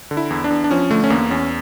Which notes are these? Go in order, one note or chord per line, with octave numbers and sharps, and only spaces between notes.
D3
E4
E2
D4
E2
D4
F3 C#4
D3 A3
C#4
E2 A#3
E2 C#4